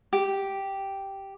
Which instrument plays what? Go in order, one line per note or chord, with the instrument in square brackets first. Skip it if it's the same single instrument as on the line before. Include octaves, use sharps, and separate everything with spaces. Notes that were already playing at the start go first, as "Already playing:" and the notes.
[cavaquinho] G4